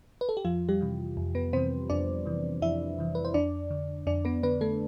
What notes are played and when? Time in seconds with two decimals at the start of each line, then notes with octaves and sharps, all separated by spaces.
0.21 B4
0.29 A4
0.37 G4
0.45 F2 F3 F4
0.69 G3 G4
0.81 C3 E3
1.17 F2
1.35 B3 B4
1.53 C3 E3 C4 C5
1.90 F2 D4 D5
2.26 C3 E3
2.62 F2 E4 E5
2.99 C3 E3
3.15 B4
3.25 C5
3.34 F2 D4 D5
3.71 D3
4.07 F2 D4 D5
4.25 B3 B4
4.43 D3 B3 B4
4.61 A3 A4